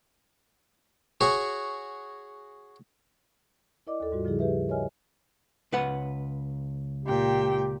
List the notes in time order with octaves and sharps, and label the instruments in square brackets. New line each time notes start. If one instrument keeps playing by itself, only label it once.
[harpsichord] F#4 G#4 C#5
[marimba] E4 A#4 D5 D#5 D6
D#2 A4
G#2 G3 F4 F#4
C#3 F3 G3 E4 G#4
G4 G#4 B4 E5
A#4 C#5 D#5 E5 G#5 F6
[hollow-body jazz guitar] C#2 B4 F#5
[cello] A#2 G5 [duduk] G4